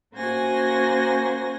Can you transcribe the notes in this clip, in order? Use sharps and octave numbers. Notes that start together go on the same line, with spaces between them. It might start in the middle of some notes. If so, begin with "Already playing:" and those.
A#3 C#4 F#4 C5 G#5 A#6